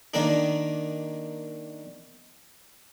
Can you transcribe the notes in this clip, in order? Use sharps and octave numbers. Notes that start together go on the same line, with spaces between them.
D#3 A#3 D4